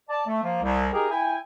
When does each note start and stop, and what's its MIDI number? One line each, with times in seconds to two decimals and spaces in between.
0.09 0.25 74
0.09 0.25 81
0.27 0.43 57
0.43 0.61 53
0.43 0.61 58
0.63 0.88 36
0.93 1.08 63
0.93 1.08 67
0.93 1.08 68
0.93 1.08 70
1.10 1.38 64
1.10 1.38 79
1.10 1.38 80